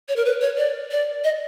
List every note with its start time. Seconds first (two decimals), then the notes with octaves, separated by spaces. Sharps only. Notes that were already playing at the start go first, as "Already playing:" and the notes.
0.08 C#5
0.16 A#4
0.25 B4
0.41 C#5
0.58 D5
0.91 D5
1.24 D#5